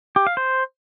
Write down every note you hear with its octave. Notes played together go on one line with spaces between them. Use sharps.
G4
F5
C5